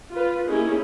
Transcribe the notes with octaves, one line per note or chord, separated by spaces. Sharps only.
F4 B4
A#3 C#4 D#4 E4 G4 G#4